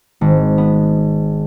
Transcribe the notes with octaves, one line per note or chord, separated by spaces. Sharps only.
G#1
B3